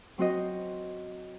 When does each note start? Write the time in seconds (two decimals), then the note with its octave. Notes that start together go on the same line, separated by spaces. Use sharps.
0.18 F#3 C4 F#4 C5 D#5